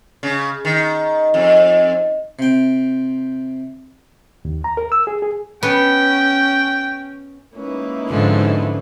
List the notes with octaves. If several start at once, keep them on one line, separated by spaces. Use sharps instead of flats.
C#3
D#3
F2
C3 G5
D#2
A#5
A#4
E6
G#4
G#4
B3 C#4 G5
G#3 A#3 C#4 D#4 E4 B4
G#2 D3 F3